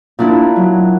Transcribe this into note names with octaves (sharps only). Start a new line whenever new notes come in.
A#2 D4 E4
F#3